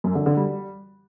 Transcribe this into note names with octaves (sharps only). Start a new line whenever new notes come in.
F#2
D3
D3
G3